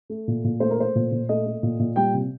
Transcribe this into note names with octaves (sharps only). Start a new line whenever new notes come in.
A3
A#2
A#2
A3 C5
A#4
A3 C5
A#2
A#2
A3 D#5
A3
A#2
A#2
G3 G5
C3